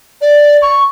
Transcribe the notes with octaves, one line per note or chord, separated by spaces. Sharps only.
D5
C#6